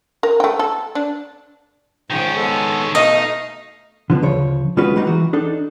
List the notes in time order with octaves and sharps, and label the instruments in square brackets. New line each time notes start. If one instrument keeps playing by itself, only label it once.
[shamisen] A#4
A3 G5
A4
D4
[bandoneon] G#2 F3 G5 [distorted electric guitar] D#3 C#4
[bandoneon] G#3 B3 A4
[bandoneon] B2 A3 F5 [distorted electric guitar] D#4 [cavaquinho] D#5
[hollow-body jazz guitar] D3 F3 B3
D2 C#3 F3 C#5
C2 G#3 C#4 F4 F#4 B4
G3 G#3 A#3 D#4 F#4
E3 F#4
D4 D#4 A4